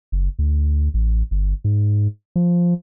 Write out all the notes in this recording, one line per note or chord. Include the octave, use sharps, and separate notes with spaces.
F#1
D2
A1
G1
G#2
F3